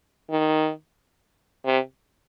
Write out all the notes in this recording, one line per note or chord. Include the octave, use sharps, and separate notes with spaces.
D#3
C3